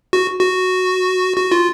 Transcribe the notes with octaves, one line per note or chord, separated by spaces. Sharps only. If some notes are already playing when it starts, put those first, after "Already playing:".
F#4
F#4
F#4
F4